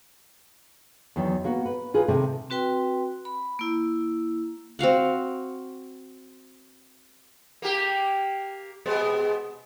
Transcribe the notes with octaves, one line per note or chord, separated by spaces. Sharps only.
E2 D#3 F#3
A#3 B3 F#4
B4
D#3 F4 G#4 B4
C3 D#3 A3
C4 F#4 B4 G5 C6
B5
A#3 E4
C4 F#4 F5 F#5
A#3 G4
B2 G#3 B3